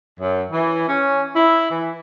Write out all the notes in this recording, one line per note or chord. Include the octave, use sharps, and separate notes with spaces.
F#2
E3
C#4
E4
E3